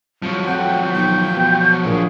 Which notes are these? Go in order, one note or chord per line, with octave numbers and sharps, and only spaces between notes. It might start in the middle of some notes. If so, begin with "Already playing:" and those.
C2 F3 F#3
F2 F#5 G5
B1 G6
B2
A#1 A#2 G#4